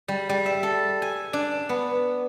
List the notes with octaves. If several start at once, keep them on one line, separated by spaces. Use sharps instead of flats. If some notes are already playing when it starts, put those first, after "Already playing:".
G3
G3
E5
A4
G#5
D4
B3